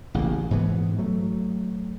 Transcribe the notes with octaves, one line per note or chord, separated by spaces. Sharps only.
A1 C#3 G3 A#3
G#2 E3 B3
F#3 A3